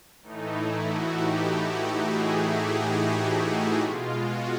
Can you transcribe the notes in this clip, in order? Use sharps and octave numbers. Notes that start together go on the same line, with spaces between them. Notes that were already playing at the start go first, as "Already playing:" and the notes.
A2 E3 A3 D#4
E4
F#4
G4
G#4
G4
G4
F#4
B2 G#3 F4
F#4